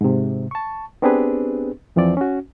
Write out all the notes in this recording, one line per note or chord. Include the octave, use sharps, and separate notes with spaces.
G#2 C3
A5 C#6
B3 C4 D4 G4 G#4 B4
F2 E3 F3 C4 D5
C#4 F#4